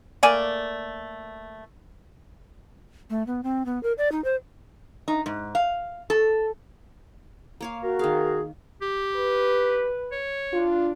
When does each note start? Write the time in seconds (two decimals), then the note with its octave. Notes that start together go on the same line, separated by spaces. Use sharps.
0.23 A3 A#3 D5 G#5
3.10 A3
3.27 B3
3.44 C4
3.66 B3
3.83 A#4
3.98 D5
4.12 D#4
4.24 C5
5.08 D#4
5.26 G#2
5.55 F5
6.10 A4
7.61 A#3 C#5 F5
7.83 F#4 A#4
7.99 D#3 G#4 F5
8.82 G4
9.14 B4
10.12 C#5
10.53 D4 F4